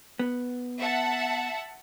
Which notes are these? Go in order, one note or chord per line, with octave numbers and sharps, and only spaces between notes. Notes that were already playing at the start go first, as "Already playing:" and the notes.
B3
E5 F#5 A5